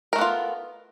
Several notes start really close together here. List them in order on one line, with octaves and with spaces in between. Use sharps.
A#4 A3 B3 F4